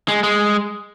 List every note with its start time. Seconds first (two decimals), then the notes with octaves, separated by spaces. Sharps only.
0.08 G#3
0.24 G#3